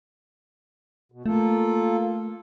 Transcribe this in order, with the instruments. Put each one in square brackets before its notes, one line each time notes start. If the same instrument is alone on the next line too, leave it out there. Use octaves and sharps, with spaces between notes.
[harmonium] B2
[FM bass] A3 [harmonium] A#3 F4 A4